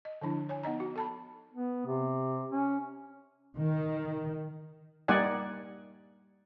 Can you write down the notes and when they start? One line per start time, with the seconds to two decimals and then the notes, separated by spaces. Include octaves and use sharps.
0.05 D#5
0.21 D3 F3 D4 E4
0.49 C#5 G#5
0.63 B3 D#4 D#5 A#5
0.80 F#4
0.96 A4 A5 B5
1.53 B3
1.86 C3
2.52 C#4
3.57 D#3
5.08 G3 A#3 D#4 D5 F#5 G#5